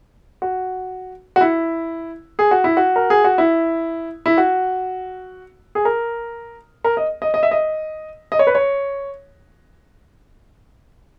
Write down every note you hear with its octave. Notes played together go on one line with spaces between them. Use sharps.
F#4
F#4
E4
G#4
F#4
E4
F#4
A#4
G#4
F#4
E4
E4
F#4
G#4
A#4
A#4
D#5
D#5
D#5
E5
D#5
D#5
C#5
B4
C#5